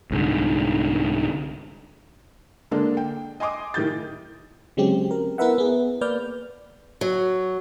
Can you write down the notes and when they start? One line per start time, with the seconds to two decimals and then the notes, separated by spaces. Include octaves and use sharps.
0.11 C2 G#2 D3
2.71 D3 G#3 A#3 D4 A4
2.97 G5
3.40 D#5 G#5 C6 D6 D#6
3.74 A2 D#3 G4 G6 A6
4.77 C#3 F#3 G#3 C4 C#4 G4
5.11 A#4
5.38 B3 E4 A#4 B4 E5 F#5
5.58 B3 G#4
6.01 A#3 B4 D5 F6 G6
7.01 F#3